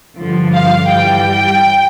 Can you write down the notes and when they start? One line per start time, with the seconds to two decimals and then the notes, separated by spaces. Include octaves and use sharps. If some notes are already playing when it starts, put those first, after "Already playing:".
0.19 G2 D3 F3
0.55 F5
0.90 G2 E3 G3 G5